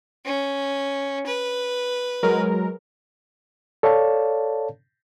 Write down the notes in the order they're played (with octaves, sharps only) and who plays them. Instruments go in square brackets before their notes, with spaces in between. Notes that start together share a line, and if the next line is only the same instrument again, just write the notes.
[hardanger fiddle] C#4
B4
[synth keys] F#3 G#3 A#4
[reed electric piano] A4 C#5 D5 F5 A5